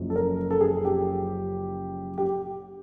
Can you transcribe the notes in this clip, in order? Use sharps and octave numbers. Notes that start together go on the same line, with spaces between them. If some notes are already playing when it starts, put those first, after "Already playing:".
Already playing: F#1 F#2 C#3 F3
A4
A#4
A4
G#4
G4
G4